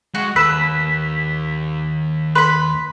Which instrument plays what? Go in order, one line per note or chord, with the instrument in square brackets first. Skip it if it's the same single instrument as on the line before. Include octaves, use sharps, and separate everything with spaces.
[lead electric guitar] G#3 [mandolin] F#4
[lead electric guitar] D#2 [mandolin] B4 [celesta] E6 E7 [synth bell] B6
[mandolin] B4 B5 [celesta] C6